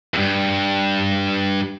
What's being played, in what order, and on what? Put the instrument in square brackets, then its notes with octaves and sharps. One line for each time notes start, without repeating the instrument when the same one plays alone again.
[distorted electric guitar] E2 G2